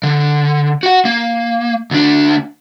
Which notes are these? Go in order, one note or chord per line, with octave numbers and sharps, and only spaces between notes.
D3
F#4 F#5
A#3
D2 D4